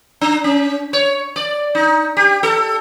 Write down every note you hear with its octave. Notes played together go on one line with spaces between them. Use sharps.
D4
C#4
C#5
D5
D#4
G4
A4